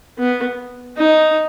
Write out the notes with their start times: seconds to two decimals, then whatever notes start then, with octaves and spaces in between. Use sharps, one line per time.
0.18 B3
0.98 D#4